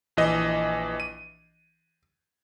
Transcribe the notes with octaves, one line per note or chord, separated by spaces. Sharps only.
A#1 E3 D#5
D#7